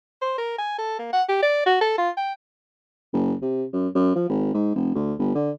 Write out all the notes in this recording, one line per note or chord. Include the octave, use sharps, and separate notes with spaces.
C5
A#4
G#5
A4
A#3
F#5
G4
D5
F#4
A4
F4
G5
F#1
C3
F#2
F#2
F3
G#1
G#2
F1
D2
G1
D3